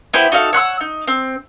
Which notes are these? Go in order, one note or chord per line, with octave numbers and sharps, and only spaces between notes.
B3 E4 G4 C5
D#4 F#4 A4 F5
C#5 F#5 C6 E6
D#4
C4